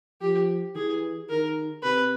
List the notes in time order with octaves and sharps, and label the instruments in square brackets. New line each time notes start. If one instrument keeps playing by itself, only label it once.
[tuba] F3 [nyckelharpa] G4
[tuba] E3 [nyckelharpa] G#4
[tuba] D#3 [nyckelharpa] A#4
[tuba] C3 [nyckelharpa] B4